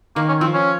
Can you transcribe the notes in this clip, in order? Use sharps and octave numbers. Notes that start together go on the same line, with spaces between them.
D#3 A#3
C#4
F3 C4
C#4